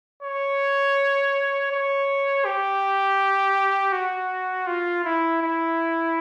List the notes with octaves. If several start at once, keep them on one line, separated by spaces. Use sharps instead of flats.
C#5
C#5
G4
F#4
F4
E4
E4